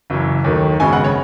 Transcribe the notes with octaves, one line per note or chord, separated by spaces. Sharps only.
F#1 F#2 E3
D#2 D#3 F#3 A3
G#1 F#2 C#3 G#3 B3 G#5
F#5
C#5